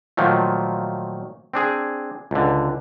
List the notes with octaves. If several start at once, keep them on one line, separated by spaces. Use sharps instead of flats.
A#2 D#3 F3 F#3 A3
C4 D4 G#4
C#2 D3